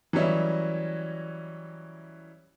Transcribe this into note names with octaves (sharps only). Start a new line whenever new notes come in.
E3 F#3 G3 C#4 D#5 E5